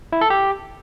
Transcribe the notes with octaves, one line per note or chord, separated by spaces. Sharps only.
E4
A4
G4